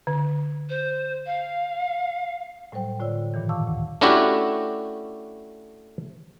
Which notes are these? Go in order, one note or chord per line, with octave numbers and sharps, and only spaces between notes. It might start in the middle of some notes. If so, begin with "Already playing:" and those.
D3
C5
F5
A2 F#3 G3 C5 G5
A2 D3 F4 C#5 D5 E6
G2 A#2 D#3 E3
F5 A5 C#6 D6 E6
D2
A3 C#4 D4 E4 F#4 G4